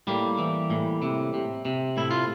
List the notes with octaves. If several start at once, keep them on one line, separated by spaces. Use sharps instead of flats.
A2 G3 A#3
E3
A2
C3
C3
C3
A2 E4
F4